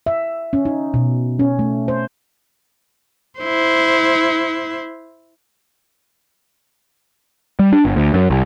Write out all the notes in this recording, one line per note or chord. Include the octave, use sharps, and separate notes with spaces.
E5
C#4
D#4
B2
C#4
A3
C5
E4 C5
G3
D4
G1
D2
F#2
C2